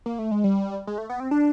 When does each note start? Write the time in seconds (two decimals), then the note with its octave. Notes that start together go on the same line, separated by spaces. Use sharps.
0.06 A#3
0.19 A3
0.31 G#3
0.44 G3
0.87 G#3
0.98 A3
1.10 B3
1.20 C4
1.31 D4